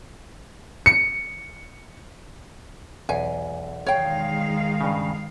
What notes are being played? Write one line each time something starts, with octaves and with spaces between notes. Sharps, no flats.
C#7
B1 E2 G#5
D#3 G#3 C#5 F5 G5
G2 C#3